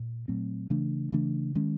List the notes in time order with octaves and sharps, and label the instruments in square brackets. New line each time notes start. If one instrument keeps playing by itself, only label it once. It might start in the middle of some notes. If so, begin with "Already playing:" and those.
Already playing: [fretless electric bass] A#2
A#2 F#3 A3 C4
C#3 E3 A3 D4
C#3 E3 A3 D4
D#3 G#3 C#4